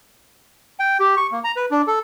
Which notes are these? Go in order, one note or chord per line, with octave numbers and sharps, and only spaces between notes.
G5
G4
C#6
A#3
A#5
B4
D4
A4